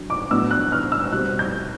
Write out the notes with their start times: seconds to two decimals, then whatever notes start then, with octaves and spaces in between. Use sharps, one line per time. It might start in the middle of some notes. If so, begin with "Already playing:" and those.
Already playing: F#3 D4
0.10 D6
0.31 A2 F#3 B3 D4 E6
0.51 F#6
0.72 F6
0.92 E6
1.12 B2 G3 C4 F#6
1.39 G6